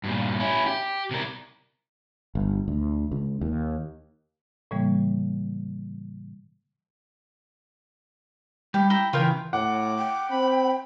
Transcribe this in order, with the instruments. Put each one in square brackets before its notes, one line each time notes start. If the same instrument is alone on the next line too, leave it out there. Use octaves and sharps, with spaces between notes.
[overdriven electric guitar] G2 A#2
C#4 E4
G4
C3 A#4
[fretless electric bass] G1
D2
C#2
D#2
[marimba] A2 C#3 E3 G3 A#3
[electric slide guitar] G3 [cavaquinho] G4
[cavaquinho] E4 A#5 [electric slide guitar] G5
[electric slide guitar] C#3 E3 [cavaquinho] F4 A#4 G5
[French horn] A2 [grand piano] F#5 [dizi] D6
[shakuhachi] G5
[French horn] C4 [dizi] B5